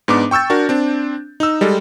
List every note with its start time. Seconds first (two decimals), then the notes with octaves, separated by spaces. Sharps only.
0.08 G#2 B3 D4 D6
0.31 G5 C#6 E6 G6 A6
0.50 D4 F#4 A#4
0.69 C4 D4
1.40 D#4 E6
1.61 G3 G#3 A4